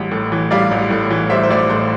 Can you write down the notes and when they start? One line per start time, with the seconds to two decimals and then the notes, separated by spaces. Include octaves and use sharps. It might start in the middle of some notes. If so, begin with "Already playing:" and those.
Already playing: A1 G3
0.11 A2
0.32 E3
0.51 G3 D5 F5
0.71 A1
0.90 A2
1.10 E3
1.30 G3 C5 E5
1.43 C5
1.50 A1 D5
1.70 A2 C5